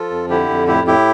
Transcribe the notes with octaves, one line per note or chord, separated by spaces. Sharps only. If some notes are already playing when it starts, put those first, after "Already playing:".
Already playing: F3 F4 A4
F2
D3 E4 G4
F2
A2 E4 G4
A2 E4 G4